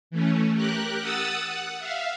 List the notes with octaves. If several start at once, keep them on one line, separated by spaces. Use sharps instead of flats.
E3 A3 C#4
G4 A#4 F#6
F#5 D#6 E6 A6
F#5
E5 F5